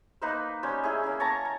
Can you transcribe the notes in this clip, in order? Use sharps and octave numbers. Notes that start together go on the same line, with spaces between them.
A#3 D#4 B4 C5
G3 C#4 C5
C#4 E4 G#4
A#3 C#4
C#5 A5 A#5 C#6
A#5